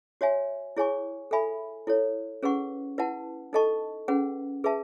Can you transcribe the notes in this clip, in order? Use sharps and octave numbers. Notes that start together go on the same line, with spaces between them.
F#4 C#5 E5 G#5
E4 G#4 C#5 G#5 C#6
A4 E5 G#5 B5
E4 A4 C#5
C#4 G#4 B4 F#5 C#6
E4 B4 F#5 A5
D#4 A4 D#5 A5 C#6
C#4 G#4 B4 F#5
G#4 B4 E5 A5